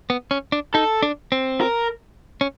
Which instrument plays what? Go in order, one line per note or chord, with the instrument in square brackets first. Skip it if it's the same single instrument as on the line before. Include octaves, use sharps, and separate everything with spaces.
[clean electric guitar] B3
C#4
D4
[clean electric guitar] D#4 [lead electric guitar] A4
[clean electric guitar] D4
C4
[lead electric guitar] A#4
[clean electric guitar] C#4